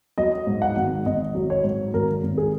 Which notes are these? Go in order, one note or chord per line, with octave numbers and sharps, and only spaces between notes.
F#3 D#5
G#2
F#5
G#1
G#1 D#5
F#3
C#5
G#2
G#1 A#4
G#1
G#4